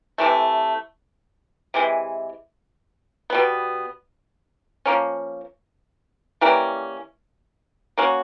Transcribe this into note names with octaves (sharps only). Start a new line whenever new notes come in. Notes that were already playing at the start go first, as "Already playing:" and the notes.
C3 E3 A3
C3 E3 G#3
B2 G3 B3
F3 A#3 C#4
E3 G3 A#3 C#4
A#3 C#4 F#4